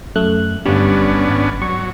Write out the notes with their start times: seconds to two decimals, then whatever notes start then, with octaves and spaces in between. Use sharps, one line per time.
0.16 F#2 A3 F#6
0.66 G1 G3 B3 C#4 D4
1.29 G#1
1.62 F#3 C#6